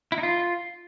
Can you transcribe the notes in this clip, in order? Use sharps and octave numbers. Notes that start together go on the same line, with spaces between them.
E4
D#4
F4